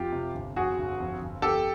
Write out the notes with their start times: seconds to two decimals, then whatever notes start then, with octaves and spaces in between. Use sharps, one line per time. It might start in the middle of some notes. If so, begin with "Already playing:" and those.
Already playing: F2 F4 G4
0.12 C3
0.34 G1
0.56 F2 F#4 G#4
0.79 G1
1.00 F2
1.22 G1
1.42 F2 G4 A4